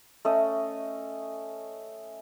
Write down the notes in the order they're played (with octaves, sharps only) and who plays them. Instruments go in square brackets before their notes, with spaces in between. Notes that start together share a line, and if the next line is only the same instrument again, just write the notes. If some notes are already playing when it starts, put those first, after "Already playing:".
[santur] A3 C#4 D#5